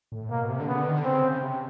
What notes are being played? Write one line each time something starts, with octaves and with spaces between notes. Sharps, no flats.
A2
B2 A#3
C3
D3
C#3 B3
D3
D#3
D3
C#3 C4
C#3
C3